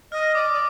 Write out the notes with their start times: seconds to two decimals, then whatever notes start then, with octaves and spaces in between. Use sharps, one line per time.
0.12 D#5 F6
0.35 D5 D6
0.53 D5